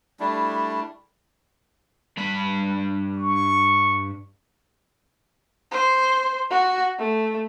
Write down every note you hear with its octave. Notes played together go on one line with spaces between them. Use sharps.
G3 A3 D4 E4
G2 B5
C#6
C5
F#4
A3